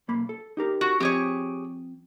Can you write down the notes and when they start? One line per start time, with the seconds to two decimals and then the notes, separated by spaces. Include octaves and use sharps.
0.08 B1 A#3 B5
0.29 A4
0.57 D#4 G4 A#4
0.81 F#4
1.00 F3 C4 G4 G#4 C#5